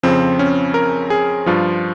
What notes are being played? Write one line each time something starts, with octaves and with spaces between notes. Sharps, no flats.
F2 C#3 F3 C4
C#4
A#4
G#4
G2 F3 F4